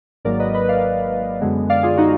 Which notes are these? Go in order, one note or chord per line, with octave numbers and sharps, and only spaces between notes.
G#1 G#2 F#3 A#3 A#4 D5
B4 D#5
B4 D#5
D5 F5
F#2 D3 G#3 B3
D5 F5
F4 G#4
D#4 F#4